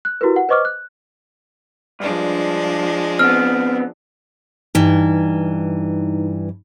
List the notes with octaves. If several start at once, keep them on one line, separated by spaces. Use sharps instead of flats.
F#6
E4 F#4 G4 A#4 B4
F#5
B4 C5 D#5 C#6 D6 F6
F#6
G2 F3 G#3 D4
B3 C4 F6
G2 E3 D#4